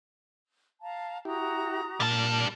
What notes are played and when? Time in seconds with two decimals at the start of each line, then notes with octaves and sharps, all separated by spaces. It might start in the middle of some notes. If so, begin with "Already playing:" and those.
0.81 F5 A5 A#5
1.25 E4 F#4 G4 A#5 D#6
2.00 A#2 G3 A5 F6